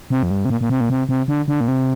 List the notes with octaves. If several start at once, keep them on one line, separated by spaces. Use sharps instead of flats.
C3
F2
G2
C3
A#2
A#2
C3
A#2
C3
C3
D3
D3
A#2
C3